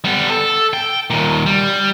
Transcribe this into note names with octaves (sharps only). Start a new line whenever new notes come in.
G3 B3
A4
G5
D#2 A#2
G3